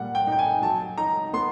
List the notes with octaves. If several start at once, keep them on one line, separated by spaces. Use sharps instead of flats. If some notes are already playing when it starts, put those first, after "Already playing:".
Already playing: A#2 G3 A#3 F#5
G5
D#4 G5
G#5
F#3 A5
D#4 A#5
B3 C6